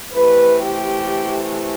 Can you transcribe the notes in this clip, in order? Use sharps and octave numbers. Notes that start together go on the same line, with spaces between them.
C3 E3 A3 B4
G4